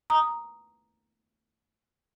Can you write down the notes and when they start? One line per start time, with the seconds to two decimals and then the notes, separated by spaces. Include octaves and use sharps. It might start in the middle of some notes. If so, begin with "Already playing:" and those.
0.10 A#5 D#6